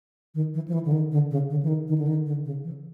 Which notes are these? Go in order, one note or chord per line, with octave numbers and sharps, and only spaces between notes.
D#3
E3
F3
E3
D3
D#3
D3
C#3
D3
E3
D#3
D#3
D3
D#3
D3
C#3
E3